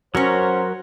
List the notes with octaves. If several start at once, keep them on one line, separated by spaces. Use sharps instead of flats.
F#3 C#4 F#4 A#4 C5 C#5